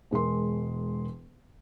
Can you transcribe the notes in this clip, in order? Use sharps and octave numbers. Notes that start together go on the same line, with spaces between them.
E1 G#3 A#4 C6